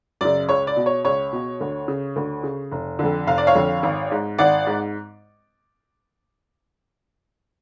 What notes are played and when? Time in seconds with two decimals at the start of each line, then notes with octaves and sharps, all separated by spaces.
0.21 F#2 C#3 D5
0.49 C#2 C#5
0.67 D5
0.76 B2
0.86 C#5
1.05 C#2 C#5
1.32 B2
1.60 D2
1.88 C#3
2.16 D2
2.43 C#3
2.71 F1
2.99 F2 D3
3.27 F1 F5
3.38 D5
3.47 C#5 F5
3.55 F2 D3
3.83 G#1
4.11 G#2
4.38 G#1 D5 F#5
4.67 G#2